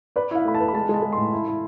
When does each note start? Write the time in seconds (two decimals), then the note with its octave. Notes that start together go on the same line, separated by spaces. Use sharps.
0.16 B4 D5
0.31 E4 F5
0.45 A3 B5
0.55 A5
0.60 B4
0.68 B5
0.74 G#3 A5
0.89 G#3
0.94 A5
1.03 G#3
1.13 A2 C6
1.33 E4
1.47 E4